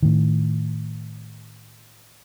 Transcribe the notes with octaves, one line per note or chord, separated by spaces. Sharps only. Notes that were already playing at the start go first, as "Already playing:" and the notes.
A2 D#3